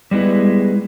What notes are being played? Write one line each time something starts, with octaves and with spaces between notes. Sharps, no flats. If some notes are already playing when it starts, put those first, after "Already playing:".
G3 G#3 B3 E4 B4